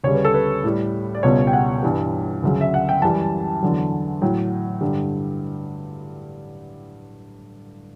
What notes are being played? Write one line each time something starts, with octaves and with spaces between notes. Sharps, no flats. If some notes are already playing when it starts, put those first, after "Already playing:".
D2 C#3 G3 C#5
B4
A4
B4
A2 G3
D5
C#2 B2 G3 C#5
G5
F#5
G2 E3 G3
D2 C#3 F#3
E5
F#5
G5
F#2 E3 G3 A5
E2 D3 F#3
A2 F#3 G5
G2 D3 G3